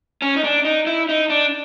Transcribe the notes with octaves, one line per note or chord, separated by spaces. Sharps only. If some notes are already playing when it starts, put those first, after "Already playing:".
C#4
D#4
D4
D#4
E4
D#4
D4